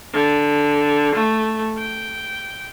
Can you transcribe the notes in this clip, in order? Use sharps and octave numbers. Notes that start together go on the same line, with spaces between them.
D3
A3
G5